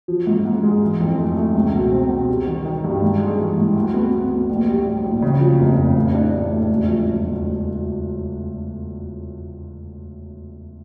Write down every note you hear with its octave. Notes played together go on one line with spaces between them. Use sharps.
F3
G#2
G#2
G#3
E3
F2
A3
A3
C#2
B2
C4
B2
G3
D#3
D#3
G2
G#2
G#3
E3
G#2
D2
B3
B3
D2
A#1
G3
A2
A#1
C#3
F3
F1
F1
A2
D4
A2
A3
E1
F3
E1
D2